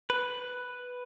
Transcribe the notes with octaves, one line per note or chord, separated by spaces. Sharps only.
B4